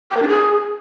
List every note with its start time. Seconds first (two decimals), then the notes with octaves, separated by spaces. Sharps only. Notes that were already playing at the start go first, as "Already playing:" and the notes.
0.11 G5
0.17 A#4
0.22 D4
0.28 G#4